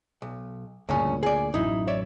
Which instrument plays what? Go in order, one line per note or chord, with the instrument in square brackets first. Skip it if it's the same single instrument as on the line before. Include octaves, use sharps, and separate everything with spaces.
[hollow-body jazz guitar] B1
[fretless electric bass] D2 A#2 [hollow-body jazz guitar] G2 C#3 C#4
[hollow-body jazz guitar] G#4 D5
[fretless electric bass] A1 F#2 [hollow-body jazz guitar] D#4 E4
[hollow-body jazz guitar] C#5 D5 E5